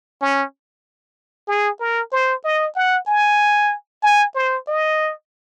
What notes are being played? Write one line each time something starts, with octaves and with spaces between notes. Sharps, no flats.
C#4
G#4
A#4
C5
D#5
F#5
G#5
G#5
C5
D#5